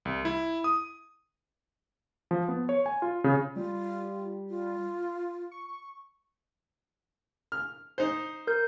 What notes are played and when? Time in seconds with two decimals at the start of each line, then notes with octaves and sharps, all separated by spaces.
0.05 C2
0.25 E4
0.64 D#6
2.31 F3
2.48 B3
2.69 C#5
2.86 G#5
3.02 F4
3.24 C#3
3.56 G3 F4
4.50 F4
5.51 C#6
7.52 F6
7.98 D#4 C5
8.47 A#4 G6